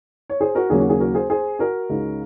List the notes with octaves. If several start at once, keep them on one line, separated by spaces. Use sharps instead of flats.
C#5
G#4 C5
F#4 A#4
D#2 C#3 F#3 A#3 C#4 G#4
F#4
G#4
F#4 A#4
G#4 C5
G#4 C5
F#4 A#4
C#2 C#3 G#3 D#4